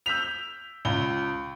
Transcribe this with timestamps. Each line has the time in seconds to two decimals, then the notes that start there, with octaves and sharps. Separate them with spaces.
0.06 E6 G6 B6 F7
0.85 C#2 G7